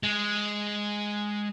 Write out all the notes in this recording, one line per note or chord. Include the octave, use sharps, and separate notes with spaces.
G#3